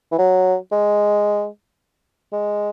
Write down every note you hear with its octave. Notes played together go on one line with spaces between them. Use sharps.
E3
F#3
G#3
G#3